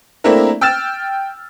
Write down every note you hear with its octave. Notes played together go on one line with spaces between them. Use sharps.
A3 A#3 C4 D4 E4 A#4
G5 E6 F6 A6 E7